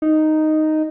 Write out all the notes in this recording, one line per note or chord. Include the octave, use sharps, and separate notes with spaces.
D#4